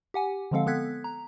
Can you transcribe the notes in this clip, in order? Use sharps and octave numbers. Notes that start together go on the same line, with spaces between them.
G4 F#5 G#5
D3 F3 G#3 C4 A4 F5
B3 A4 F#6 G#6 B6
A#5